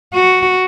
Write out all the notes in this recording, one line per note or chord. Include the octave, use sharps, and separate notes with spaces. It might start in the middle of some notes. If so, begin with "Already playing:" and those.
F#4